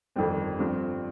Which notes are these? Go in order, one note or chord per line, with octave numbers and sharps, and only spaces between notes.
G1 F2 D#3 G3 C4
G2 F3 C4